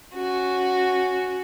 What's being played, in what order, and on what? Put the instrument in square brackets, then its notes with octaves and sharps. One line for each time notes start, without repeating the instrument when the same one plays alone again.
[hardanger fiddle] C#4 F#4